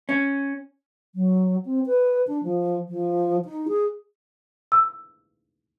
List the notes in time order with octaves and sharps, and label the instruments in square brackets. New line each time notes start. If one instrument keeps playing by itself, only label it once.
[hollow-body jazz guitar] C#4
[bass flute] F#3
C4
B4
D4
F3
F3
D#4
G#4
[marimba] E6